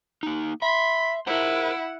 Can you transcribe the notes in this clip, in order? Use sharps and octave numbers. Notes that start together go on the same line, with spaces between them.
A#3 D#4
E5 B5 C6
E4 A#4 C5 F#5